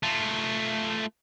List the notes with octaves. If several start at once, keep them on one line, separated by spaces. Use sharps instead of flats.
A3 F4